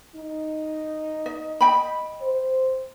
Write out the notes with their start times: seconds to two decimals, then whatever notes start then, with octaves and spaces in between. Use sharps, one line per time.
0.15 D#4
1.26 D#5
1.61 D#5 G5 B5
2.21 C5